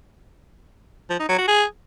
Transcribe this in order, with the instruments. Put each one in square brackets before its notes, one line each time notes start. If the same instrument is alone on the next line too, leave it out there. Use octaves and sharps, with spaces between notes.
[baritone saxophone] F3
D#4
F#3
F#4
G#4